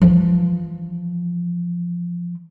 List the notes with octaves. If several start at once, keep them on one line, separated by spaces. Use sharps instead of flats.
E3 F3